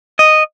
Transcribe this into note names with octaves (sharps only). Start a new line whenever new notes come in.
D#5